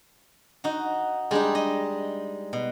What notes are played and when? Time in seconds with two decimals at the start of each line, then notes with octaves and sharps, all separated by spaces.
0.64 D#4 F#4
1.31 G3 G#3 D4 D#4
1.55 D#5
2.53 B2